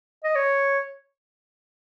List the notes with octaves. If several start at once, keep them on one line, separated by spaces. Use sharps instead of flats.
D#5
C#5